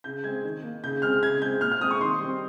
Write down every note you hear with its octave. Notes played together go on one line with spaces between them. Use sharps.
C#3 G6
G#3 C4 G#6
D#3
A#3
C#3 G6
G#3 C4 F6
C#3 G#6
G#3 C4 G6
A#2 F6
F6
G#3 C4 D#6
C#6
D#3 C6
G3 C4